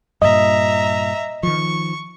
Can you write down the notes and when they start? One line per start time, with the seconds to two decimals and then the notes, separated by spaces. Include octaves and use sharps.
0.22 G2 A#2 D#5 E5 A#5
1.43 D#3 F3 C#6